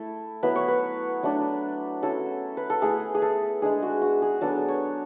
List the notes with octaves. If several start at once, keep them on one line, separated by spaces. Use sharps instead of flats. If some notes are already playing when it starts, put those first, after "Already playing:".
Already playing: A3 E4 A4
F#3 B3 E4 B4
C#5
B4
F#3 A3 D4
F#3 C#4 E4 A4
B4
A4
A3 E4 G#4
G#4
A4
G#3 D4 G#4
F#4
F#4
G#4
F#3 B3 D4 A4
C#5